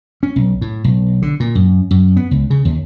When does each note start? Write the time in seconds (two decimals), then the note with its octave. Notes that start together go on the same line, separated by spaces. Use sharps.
0.23 C#4
0.36 B1
0.61 A2
0.84 B1
1.22 D3
1.40 A#2
1.55 F#2
1.91 F#2
2.17 B3
2.31 C#2
2.50 C#3
2.65 D#2